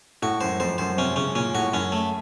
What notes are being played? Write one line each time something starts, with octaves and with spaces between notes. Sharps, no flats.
A2 F#4
F#2 C5
F2 C5
F#2 C5
C3 C#4
C#3 C#4
A#2 C#4
A2 F#4
F#2 C#4
A3